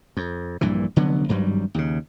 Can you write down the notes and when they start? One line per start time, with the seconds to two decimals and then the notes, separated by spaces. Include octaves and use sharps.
0.17 F2
0.61 A#1 G2 A#2 E3
0.96 F1 D3 F#3 B3
1.29 G#1 G2 F#3 G3
1.74 D#2 C#3